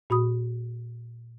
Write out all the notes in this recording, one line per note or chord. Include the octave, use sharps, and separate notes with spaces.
A#2 F#4 B5 D#6